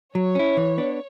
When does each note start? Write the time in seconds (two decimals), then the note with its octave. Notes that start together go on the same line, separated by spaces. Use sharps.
0.15 F#3 C#5
0.35 C#4 E4
0.57 E3
0.78 B3 D4